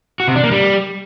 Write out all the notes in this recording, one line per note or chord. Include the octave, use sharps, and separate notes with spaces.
F#4
C3
D4
A#3
G3